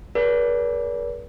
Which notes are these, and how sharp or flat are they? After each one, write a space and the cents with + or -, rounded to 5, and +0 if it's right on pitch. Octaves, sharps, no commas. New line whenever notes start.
G#4 +35 B4 -45 D5 -40